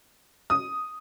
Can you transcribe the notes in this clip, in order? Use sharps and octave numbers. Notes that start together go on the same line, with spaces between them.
D#6